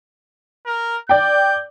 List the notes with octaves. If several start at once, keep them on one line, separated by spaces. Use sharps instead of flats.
A#4
D5 G5 G6